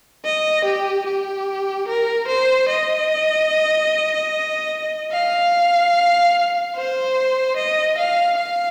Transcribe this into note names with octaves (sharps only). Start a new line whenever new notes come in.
D#5
G4
G4
A#4
C5
D#5
F5
C5
D#5
F5
F5